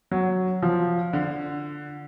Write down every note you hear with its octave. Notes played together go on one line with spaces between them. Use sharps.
F#3
F3
D3